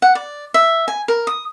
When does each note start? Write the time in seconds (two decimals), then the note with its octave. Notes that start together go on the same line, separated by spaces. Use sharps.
0.02 F#5
0.15 D5
0.54 E5
0.88 G#5
1.08 A#4
1.27 D#6